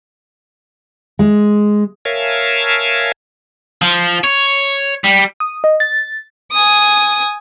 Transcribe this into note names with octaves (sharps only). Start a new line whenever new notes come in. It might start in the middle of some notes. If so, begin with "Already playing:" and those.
G#3
A#4 C#5 E5 F5 G#5 A5
F3
C#5
G3
D#6
D#5
A6
G#5 D#6